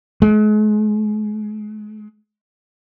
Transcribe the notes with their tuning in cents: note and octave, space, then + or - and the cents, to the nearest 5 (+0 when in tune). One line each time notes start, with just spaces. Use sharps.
G#3 +40